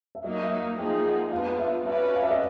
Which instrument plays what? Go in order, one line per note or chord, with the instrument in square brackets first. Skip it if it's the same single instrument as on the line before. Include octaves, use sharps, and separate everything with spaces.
[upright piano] E5
[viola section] F#3 A#3 D#4 [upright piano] D#5
[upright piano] E5
F5
[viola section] F3 A#3 D#4 G#4 [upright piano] G5
[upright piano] F#5
[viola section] G3 B3 D4 F4 [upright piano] F5
[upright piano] E5
[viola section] C#4 F#4 B4 D5 [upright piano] E5
[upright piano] F5
E5
D#5